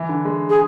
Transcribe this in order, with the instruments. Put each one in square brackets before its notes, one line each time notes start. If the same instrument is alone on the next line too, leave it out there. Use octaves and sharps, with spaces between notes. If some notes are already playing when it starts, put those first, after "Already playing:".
Already playing: [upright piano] E3
D3
G#3
[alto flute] G#4